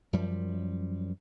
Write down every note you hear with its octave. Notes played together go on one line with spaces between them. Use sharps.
F#2 F3 G3